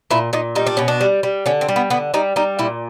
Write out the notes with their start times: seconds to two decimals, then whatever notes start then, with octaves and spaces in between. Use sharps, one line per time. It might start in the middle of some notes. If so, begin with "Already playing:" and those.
0.11 A#2 E4
0.33 A#2 D#4
0.55 G3 D#4
0.67 D4
0.77 B2 C#4
0.88 D4
1.01 G3
1.23 G3
1.46 D3 C#4
1.61 C4
1.69 G3
1.76 B3
1.90 D3 B3
2.14 G3 D#4
2.36 G3 D#4
2.59 A#2 E4